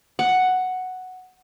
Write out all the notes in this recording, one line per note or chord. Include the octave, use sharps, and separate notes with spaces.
F#5